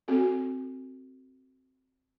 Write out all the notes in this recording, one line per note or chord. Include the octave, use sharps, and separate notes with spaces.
C4 F#4 A4